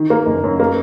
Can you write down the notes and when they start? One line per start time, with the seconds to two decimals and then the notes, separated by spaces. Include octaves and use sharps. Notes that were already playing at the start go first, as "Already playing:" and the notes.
Already playing: D#3
0.10 A#3
0.26 F#1
0.44 F#2
0.60 A#3